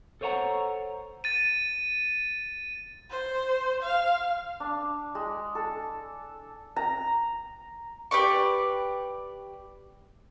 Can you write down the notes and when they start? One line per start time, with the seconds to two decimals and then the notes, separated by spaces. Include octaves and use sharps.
0.21 A4 C5 C#5 D#5 F#5 A#5
1.24 A6 D#7
3.10 C5
3.81 F5
4.60 D4
5.15 G#3
5.55 A4
6.76 A#5
8.11 G4 B4 D5 C#6